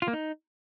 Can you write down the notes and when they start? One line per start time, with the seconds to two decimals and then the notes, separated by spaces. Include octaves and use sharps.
0.02 F4
0.08 A#3
0.13 D#4